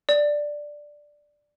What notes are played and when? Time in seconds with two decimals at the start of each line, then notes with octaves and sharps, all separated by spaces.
0.09 D5